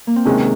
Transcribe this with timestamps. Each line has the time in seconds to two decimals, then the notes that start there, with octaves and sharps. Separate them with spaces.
0.07 A#3
0.16 C4
0.25 C3 D#3 G#3 C#4